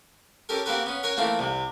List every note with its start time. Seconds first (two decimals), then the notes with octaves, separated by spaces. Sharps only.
0.49 C#4 G4 A4 A#4
0.66 A#3 C4 F#4 G4 A#4 B4
0.86 B3 C#4
1.03 A#4 C#5 F#5 G#5
1.17 E3 A3 A#3 C4 F4
1.39 C2 C3